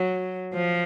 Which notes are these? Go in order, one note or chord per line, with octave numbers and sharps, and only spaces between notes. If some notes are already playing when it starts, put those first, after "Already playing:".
Already playing: F#3
F3